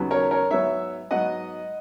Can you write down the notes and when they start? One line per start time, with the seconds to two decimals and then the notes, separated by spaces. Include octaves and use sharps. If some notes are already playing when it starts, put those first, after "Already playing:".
Already playing: D#2 C#3 F#3 B3
0.11 A#4 C#5
0.31 A#4 C#5
0.51 G#2 F#3 B3 C#5 E5
1.11 G#2 F#3 B3 D#5 F#5